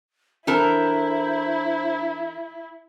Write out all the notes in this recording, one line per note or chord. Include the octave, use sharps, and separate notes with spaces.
E3 D4 E4 A4 A#4 C5 A#5